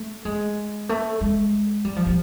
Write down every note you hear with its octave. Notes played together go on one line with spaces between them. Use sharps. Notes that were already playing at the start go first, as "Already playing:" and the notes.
Already playing: A3
G#3
A3
G#3
G3
F3
F3